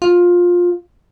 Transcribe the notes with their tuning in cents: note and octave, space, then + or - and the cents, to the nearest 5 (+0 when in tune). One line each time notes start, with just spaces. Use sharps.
F4 +15